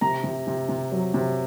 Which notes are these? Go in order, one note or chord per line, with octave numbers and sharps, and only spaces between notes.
C3 A#5
C3
C3
C3
F#3
C3